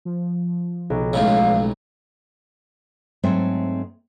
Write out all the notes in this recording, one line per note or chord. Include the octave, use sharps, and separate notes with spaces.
F3
B1
C#2 A2 C#3 F5
G#2 F#3 A3 C4 C5 E5